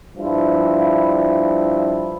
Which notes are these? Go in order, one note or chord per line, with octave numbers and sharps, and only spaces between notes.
G2 F3 E4